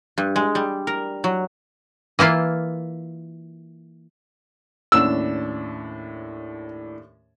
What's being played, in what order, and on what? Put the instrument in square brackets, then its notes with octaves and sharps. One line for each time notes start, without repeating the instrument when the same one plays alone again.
[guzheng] G2
G#3
G3
A#4
F#3
[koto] E3 A#3 E4 F4
[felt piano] D#2 C#4 E7 [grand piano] A2 D4 [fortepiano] E6